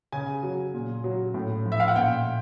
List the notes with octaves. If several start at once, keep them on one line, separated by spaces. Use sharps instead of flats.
C#3 G#5
F#3
A#2
F#3
A2
F3
E5
F5
F#5
A#2 G5